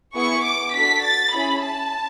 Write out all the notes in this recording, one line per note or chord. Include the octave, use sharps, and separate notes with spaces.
B3 E4 G#4 C#6
D6
D4 F#4 A4 B6
A6
C#4 E4 G#4 B5
A5